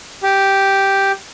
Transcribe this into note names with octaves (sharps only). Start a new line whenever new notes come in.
G4